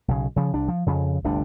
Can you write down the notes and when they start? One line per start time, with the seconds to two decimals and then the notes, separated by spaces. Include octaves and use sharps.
0.08 B1 C#3
0.36 C#3 F3
0.53 C2 D4
0.68 F3
0.86 F2 C#3
1.24 G1 D2 C3 D4